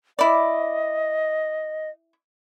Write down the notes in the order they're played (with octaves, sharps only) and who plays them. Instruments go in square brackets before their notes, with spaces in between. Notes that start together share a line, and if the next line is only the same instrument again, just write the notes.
[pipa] E4 D5 [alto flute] D#5